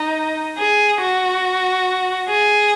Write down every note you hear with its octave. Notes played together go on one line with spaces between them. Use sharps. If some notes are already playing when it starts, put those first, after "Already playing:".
Already playing: D#4
G#4
F#4
G#4